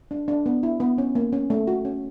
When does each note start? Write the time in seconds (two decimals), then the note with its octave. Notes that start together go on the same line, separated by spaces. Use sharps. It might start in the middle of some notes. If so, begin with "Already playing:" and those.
0.11 D4
0.28 D4
0.46 B3
0.63 E4
0.80 B3
0.98 C#4
1.15 A#3
1.33 C#4
1.50 A3
1.67 F#4
1.85 C#4